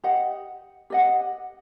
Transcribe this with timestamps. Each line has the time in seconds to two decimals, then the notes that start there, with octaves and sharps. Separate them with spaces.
0.04 G4 D#5 F#5
0.90 G4 D#5 F#5